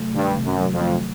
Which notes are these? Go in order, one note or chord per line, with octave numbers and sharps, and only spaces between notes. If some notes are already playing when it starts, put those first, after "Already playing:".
Already playing: C3 F#3 A3
G2 D#3
C3
F#2
F#3
F2
A3